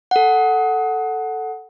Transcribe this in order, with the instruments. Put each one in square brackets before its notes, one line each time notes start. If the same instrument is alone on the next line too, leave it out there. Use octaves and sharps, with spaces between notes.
[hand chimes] A4 F#5